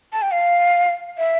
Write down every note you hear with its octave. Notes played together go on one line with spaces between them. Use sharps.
A5
G5
F5
E5